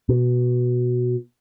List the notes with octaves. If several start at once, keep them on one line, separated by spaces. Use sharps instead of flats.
B2